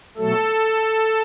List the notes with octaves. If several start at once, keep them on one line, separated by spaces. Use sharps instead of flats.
B2 F#3 A3 A4